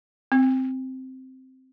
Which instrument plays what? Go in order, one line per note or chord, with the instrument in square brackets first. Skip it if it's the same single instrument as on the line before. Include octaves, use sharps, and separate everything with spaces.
[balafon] C4